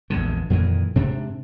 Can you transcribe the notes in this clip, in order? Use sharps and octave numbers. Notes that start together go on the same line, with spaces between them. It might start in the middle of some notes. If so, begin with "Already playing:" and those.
A#1 E2 G#2 D3
F2 A#2 D#3 E3
G#2 C3 D4